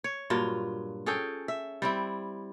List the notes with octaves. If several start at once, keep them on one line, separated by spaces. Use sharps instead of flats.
C#5
G2 A#2 F#3 F4
C#4 G#4 A4 G5
E5
G3 C4 E4